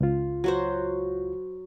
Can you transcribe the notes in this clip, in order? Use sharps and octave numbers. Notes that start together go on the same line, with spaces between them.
C#2 F4
F#3 F#4 C5